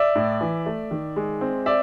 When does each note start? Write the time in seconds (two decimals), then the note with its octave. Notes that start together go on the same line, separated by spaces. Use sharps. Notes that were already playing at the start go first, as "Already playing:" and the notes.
Already playing: D5 E5
0.15 A2
0.41 E3
0.66 A3
0.91 D#3
1.16 G#3
1.41 C4
1.66 D5 E5